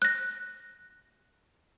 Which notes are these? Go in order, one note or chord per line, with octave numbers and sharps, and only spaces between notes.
F#6 A#6